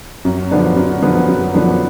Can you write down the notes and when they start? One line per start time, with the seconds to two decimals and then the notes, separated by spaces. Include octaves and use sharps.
0.25 F#2
0.51 D3 F3 B3 D4
0.76 F#2
1.02 D3 F3 B3 D4
1.28 F#2
1.54 D3 F3 B3 D4